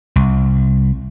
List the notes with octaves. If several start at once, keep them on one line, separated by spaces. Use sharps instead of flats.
C2